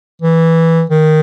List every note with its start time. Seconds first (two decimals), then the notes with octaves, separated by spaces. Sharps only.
0.22 E3
0.90 D#3